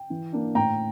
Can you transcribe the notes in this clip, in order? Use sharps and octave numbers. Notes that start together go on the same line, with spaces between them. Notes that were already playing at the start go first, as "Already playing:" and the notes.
Already playing: G5
E3
A#3 D4
A2 G5 A#5